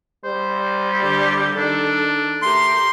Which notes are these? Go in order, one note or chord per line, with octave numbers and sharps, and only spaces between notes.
G3 C5
D3 G4
D#3 D4 A4
A3 G4 A#4 C6